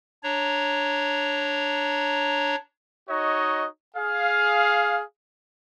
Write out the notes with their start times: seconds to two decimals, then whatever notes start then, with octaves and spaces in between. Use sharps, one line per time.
0.23 D4 C#5 A#5
3.10 D#4 F#4 C#5 D#5
3.97 G#4 F5